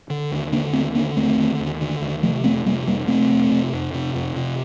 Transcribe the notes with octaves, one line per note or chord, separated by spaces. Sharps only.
D3
D#2
D3 A#3 D4
D#2 A3 C4
D3 A#3 D4
D#2 A3 C4
D3
D#2
D3
D#2
C3 F3 A3
F2 A3 C4
C3 G3 A#3
F2 G3 A#3
C3 A3 C4
F2
C3
F2
C3
F2
C3